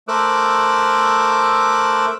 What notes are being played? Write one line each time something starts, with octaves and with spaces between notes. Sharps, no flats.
A3 A#4 C5 D6 E6 F#6